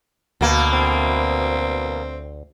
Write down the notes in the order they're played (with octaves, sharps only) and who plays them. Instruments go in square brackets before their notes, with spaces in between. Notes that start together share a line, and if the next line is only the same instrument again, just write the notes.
[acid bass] D2 [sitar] B2 A#3
[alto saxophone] C4